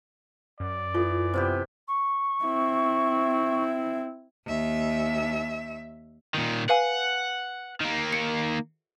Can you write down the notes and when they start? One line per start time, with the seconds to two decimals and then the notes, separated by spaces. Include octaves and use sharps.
0.60 F#2 D5
0.94 E3 F4 A4
1.34 C3 B3 G4
1.87 C#6
2.44 C4 E4
4.45 D#2 E5
6.35 A#2 D#3
6.69 B4 F5 F#5 G#5
7.80 D#3 A#3
8.13 C#7